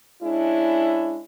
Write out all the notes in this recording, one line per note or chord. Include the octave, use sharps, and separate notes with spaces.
G#3 C#4 D4 E4